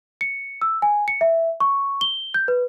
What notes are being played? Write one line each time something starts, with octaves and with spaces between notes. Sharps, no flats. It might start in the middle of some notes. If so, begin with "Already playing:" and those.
C#7
E6
G#5
C#7
E5
C#6
G7
G6
B4